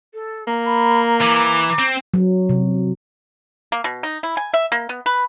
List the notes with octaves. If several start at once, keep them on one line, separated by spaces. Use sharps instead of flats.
A4
A#3 A#5
B5
E3 D6
C4
F#3
C3
A#3
B2
D#4
E4
G#5
E5
A#3
B3
B4